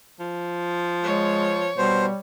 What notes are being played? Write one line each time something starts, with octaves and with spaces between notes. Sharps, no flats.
F3
G#3 C#5
B2 G3 C5